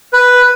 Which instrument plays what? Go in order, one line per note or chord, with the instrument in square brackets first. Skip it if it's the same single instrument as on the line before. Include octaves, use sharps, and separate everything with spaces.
[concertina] B4